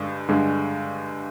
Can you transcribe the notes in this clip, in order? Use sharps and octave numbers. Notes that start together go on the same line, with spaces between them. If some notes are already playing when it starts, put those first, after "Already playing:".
Already playing: G2 D3 G#3
G2 D3 G#3